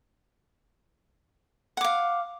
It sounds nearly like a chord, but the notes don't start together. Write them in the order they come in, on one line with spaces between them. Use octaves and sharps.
F#5 D6 F5